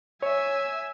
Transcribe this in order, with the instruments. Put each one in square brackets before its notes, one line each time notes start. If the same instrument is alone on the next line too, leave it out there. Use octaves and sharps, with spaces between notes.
[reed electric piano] C#5 [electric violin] E5 G#5